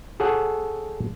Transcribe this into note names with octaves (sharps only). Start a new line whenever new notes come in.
G#4 A4 C#5 F#5